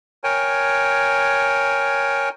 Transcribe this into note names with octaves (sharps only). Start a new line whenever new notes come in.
A#4 C#5 G5 G#5